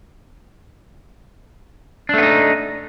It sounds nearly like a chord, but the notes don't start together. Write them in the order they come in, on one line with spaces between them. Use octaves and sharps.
D4 A3 B3 D#4